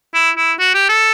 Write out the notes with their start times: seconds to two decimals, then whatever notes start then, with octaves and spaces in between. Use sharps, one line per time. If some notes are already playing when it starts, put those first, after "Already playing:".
0.14 E4
0.37 E4
0.60 F#4
0.74 G4
0.89 A4